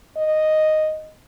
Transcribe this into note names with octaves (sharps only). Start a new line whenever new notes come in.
D#5